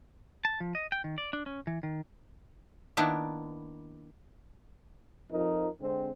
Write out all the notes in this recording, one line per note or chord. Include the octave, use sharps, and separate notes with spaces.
A5
F3
D#5
G5
D#3
D5
D4
C#4
E3
D#3
D#3 A#3 B3 D4 E4
F2 F3 D#4 A#4
D3 G#3 C4